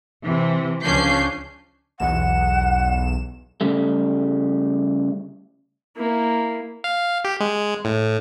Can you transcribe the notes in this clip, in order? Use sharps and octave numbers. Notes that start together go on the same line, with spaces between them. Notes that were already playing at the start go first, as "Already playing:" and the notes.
C3 E3
C#2 F3 C#4 D4 G6 C7
B1 E2 F#5 E7
C#3 G3 A3
A#3 E4
F5
G4
G#3
A2